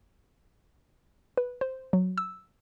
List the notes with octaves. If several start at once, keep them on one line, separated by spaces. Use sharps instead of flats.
B4
C5
F#3
E6